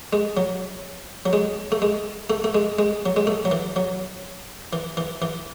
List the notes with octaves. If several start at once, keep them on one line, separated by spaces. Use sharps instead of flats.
G#3
F#3
F#3
G#3
A3
G#3
A3
A3
G#3
G#3
F#3
G#3
A3
F#3
E3
F#3
E3
E3
E3